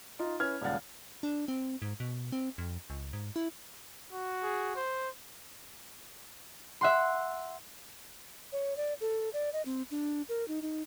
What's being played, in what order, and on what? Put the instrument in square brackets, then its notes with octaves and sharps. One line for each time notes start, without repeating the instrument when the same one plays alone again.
[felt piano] D#4 F4 D#5
C#4 E4 B4 F6 G#6
D#1 C#2 D5 F5 F#5 A6
[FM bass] D4
C4
G#2
B2
C4
F2
C#2
G#2
E4
[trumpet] F#4
[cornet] G#4
C5
[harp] E5 F#5 C6
[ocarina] C#5
D5
A4
D5
D#5
C4
D4
A#4
D#4
D#4